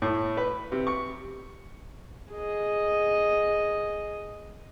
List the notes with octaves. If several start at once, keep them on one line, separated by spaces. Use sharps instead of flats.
A2
B4
C3
C#6
G#4 D#5